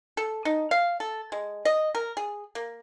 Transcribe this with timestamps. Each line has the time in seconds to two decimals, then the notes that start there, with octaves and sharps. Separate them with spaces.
0.17 A4
0.45 D#4
0.71 F5
1.00 A4
1.32 G#3
1.65 D#5
1.95 A#4
2.17 G#4
2.55 A#3